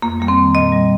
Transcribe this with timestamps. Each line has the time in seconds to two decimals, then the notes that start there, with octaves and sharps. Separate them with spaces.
0.02 F2 A#3
0.20 G3 A#3
0.28 C4
0.37 D#3
0.55 A#2 D#5
0.72 G3